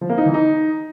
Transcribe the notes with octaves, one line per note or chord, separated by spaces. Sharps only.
F3
A#3
D#4
E3
D#4